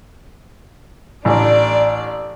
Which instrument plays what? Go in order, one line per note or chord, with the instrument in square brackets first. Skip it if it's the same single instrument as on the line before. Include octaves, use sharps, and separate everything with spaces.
[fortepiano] A1 [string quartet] D4 D5